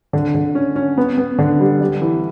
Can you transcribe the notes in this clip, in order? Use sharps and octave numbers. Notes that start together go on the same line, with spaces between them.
D3
D3
C#4
C#4
B3
B3
D3
G3
G3
E3